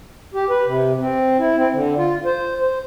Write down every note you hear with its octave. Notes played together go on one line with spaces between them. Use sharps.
G4
B4
C3
C4
E4
C4
D3
F4
C5
C5